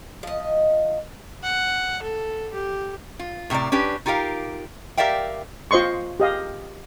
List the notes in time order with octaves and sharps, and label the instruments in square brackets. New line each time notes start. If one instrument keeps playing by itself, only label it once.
[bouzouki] F3 D#5
[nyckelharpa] F#5
A4
G4
[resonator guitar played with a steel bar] F4
A2 C3 C4 A#4 D5
C#4 D4 G4 B4
D#4 F4 G4 A#4 F5
G4 A#4 D5 E5 F5 G5
[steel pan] F4 C5 D#5 C6 C#6
G4 D#5 F5